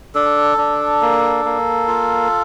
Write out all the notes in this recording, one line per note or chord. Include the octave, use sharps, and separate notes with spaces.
D4 A4
D4
A#3
A#3
F4